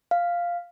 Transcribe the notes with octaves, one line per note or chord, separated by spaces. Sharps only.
F5